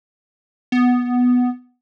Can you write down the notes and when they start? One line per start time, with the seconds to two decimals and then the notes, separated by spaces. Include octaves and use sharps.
0.72 B3